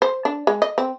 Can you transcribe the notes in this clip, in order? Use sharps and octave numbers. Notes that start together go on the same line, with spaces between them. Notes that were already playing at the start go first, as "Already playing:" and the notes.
C5
D4
G#3
D#5
C4